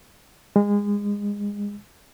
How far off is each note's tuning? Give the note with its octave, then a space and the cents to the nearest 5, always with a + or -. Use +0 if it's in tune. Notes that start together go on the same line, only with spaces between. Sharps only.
G#3 -25